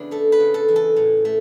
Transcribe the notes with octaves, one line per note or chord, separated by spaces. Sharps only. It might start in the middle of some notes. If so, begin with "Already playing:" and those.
Already playing: C#3 E3 B3 D4 E4
A3 A4
B4
C#3
A4
E3
A4
A2
A3